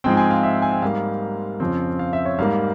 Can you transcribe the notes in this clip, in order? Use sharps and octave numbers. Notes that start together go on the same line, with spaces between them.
G#2 F3 G#3 C4 G5
G#5
F5
E5
G#5
G5
G#2 G3 A#3 F5
F2 C#3 F3 C4
F5
E5
C#5
G#2 G3 A#3 F5